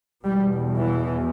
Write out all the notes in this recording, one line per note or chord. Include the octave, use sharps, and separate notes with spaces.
E2 B2 G3
E3